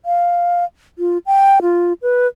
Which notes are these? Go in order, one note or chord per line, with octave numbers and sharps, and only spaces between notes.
F5
F4
G5
F4
B4